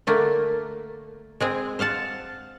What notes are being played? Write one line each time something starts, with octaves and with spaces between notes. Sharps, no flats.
D3 A3 A#3
G#3 C4 G#4
C5 F5 F#5 A5